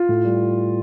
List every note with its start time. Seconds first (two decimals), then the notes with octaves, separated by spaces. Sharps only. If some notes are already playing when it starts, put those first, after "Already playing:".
Already playing: F4
0.09 A2
0.25 G3